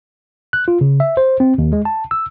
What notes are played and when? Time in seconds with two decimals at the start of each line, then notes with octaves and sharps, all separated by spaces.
0.53 F#6
0.68 F4
0.81 C#3
1.00 E5
1.17 C5
1.40 C4
1.58 D#2
1.73 G#3
1.85 A5
2.11 E6